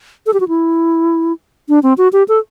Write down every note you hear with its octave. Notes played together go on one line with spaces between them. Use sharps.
A4
G4
F#4
E4
D4
C4
F#4
G4
A4